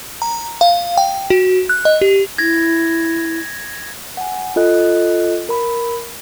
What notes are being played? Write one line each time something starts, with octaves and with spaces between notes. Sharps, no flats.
A#5
F5
G5
F#4
F#6
D#5
G4
E4 G#6 A#6
F#5 G#5
F4 A4 D#5 F#6
A#4 B5